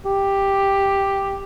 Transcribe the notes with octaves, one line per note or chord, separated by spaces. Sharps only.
G4